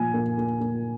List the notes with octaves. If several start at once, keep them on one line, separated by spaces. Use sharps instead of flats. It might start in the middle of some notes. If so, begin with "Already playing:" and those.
Already playing: A#2 F3 G#5
A#3
A#3
A#3